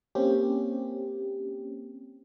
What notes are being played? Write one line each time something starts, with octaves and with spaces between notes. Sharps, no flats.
A#3 C4 C#4 G4